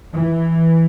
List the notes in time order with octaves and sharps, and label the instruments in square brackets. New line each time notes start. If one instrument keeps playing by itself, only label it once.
[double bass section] E3